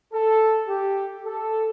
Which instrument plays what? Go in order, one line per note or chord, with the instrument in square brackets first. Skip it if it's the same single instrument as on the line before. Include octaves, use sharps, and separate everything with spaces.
[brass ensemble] A4
G4
A4